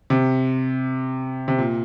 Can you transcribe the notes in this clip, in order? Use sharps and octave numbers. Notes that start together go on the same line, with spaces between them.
C3
C3
A#2